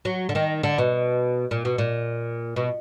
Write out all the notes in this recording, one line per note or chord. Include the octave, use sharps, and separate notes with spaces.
F#3
D3
D#3
D3
B2
A#2
B2
A#2
B2